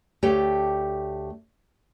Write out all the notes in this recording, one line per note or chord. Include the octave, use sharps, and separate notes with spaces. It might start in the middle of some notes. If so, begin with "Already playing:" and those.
D2 A3 G4 C#5 D5 G5